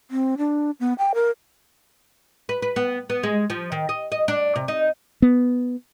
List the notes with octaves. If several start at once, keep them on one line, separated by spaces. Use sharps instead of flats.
C4
D4
B3
G5
A#4
B4
B4
B3
B3
G#3
F3
D#3
D#5
D#5
D4
C3
D#4
B3